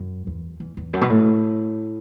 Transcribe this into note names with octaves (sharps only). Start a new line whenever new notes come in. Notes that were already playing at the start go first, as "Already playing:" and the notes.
Already playing: F#2
E2
E2
E2
F#2
B2
A2